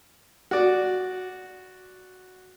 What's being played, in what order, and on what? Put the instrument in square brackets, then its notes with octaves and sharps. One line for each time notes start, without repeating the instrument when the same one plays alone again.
[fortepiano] F#4 D5